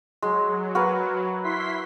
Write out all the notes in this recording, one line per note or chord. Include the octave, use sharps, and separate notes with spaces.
F#3 G#3
F#4 A#4 B4
E4 C6 B6